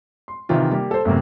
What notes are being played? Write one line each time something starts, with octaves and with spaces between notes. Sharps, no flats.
C6
C3 D#3 E3 F4
G3 A#3 G4
A4 C5
F#2 A2 C3 A#3